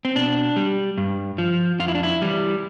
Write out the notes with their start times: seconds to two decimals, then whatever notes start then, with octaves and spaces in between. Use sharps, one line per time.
0.05 C4
0.16 B2 D4
0.56 G3
0.98 G2
1.38 F3
1.79 F2 F4
1.88 E4
1.95 D4
2.03 E4
2.22 E3 G3